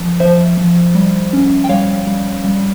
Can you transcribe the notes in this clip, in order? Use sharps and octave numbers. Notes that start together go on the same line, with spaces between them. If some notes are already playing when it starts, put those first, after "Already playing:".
Already playing: F3
F3 C5 E5
F3
G3
C#4
G5
G3 C#5 F5
G3
G3